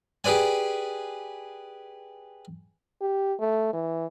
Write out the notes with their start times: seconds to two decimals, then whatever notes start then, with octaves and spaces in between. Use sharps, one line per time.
0.24 G4 G#4 B4 D5 G#5
3.01 G4
3.40 A3
3.73 E3